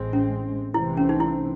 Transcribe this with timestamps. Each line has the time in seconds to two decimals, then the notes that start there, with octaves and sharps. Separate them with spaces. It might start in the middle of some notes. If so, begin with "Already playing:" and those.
Already playing: A1 A2 G#3 C4
0.13 C#4
0.74 C2 C3 E3 A3 C4 E4
0.97 C#4
1.09 D#4
1.20 E4